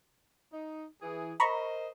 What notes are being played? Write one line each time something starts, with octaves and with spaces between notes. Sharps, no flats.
D#4
E3 G#4
A#4 C5 D#5 A#5 B5 C#6